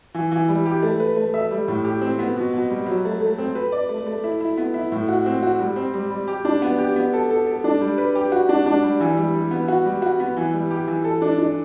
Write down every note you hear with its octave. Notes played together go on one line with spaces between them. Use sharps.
E3
E3
G3
G4
A3
B4
A3
E5
G3
A2
G4
C4
B3
B2
B2
G3
F#3
A3
A3
C4
B4
D5
A3
A3
E4
E4
B3
E4
A2
F#4
C4
F#4
G3
C4
G3
G3
G4
D4
B3
G4
B3
A4
A4
A4
D4
G3
B4
G4
F#4
D4
D4
G3
E3
G3
G3
B3
F#4
G3
F#4
B3
E3
G3
G4
E3
A4
D4
D4